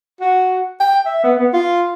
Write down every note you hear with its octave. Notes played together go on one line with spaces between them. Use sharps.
F#4
G5
E5
B3
B3
F4